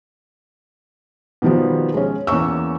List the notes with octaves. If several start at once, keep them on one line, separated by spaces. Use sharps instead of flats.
B2 D#3 F3 G3 B3
G#3 C#4
E2 A#3 C#4 C#6 E6